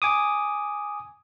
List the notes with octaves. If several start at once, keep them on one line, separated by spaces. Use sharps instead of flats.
G#5 D6 D#6